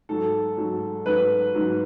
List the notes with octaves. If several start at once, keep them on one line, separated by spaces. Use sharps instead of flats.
G#2 F#3 A4
G#2 F#3
G#2 F#3 B4
G#2 F#3